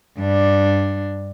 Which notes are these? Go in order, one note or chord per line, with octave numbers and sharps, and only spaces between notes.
G2 D4